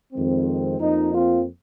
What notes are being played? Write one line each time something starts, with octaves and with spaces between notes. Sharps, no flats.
F2 D#3 G#3 C4
F2 F3 A#3 D#4
C4 F4